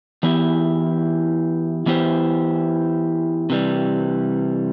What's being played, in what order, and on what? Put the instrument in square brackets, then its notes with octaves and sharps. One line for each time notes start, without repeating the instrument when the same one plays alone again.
[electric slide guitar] E3 B3 E4 G4
E3 B3 E4 G4 C5
C3 E3 G3